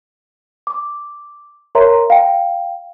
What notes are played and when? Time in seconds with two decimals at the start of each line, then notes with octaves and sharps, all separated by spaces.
0.67 D6
1.75 A#4 C#5 E5 A#5 C6
2.10 F5 G5